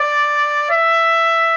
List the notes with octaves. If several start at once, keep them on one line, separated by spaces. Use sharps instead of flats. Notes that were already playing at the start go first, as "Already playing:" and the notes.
Already playing: D5
E5